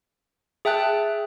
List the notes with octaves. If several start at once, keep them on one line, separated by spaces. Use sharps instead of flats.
G#4 E5 G5 A5 F#6